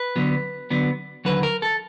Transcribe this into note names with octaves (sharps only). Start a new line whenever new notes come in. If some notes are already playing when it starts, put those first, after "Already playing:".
Already playing: B4
D3 F#3 B3
D3 F#3 B3
D#2 D3 F#3 B4
A#4
A4